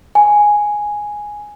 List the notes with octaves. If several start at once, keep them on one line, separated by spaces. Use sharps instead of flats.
G#5